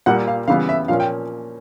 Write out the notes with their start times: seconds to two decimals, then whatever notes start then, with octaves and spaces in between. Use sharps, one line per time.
0.06 A#2 G3 A#3 F#5
0.27 F5
0.48 C#3 E3 G3 B3 F5
0.69 E5
0.88 A#2 F3 A#3 C#4 F5
1.00 G5